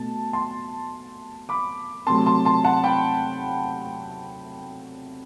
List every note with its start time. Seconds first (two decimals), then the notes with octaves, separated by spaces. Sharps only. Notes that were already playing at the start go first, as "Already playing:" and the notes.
Already playing: B2 A3 A5
0.33 A5 C6
1.49 B5 D6
2.07 C3 F#3 A3 A5 C6
2.26 A5 C6
2.45 A5 C6
2.64 F#5 A5
2.84 G5 B5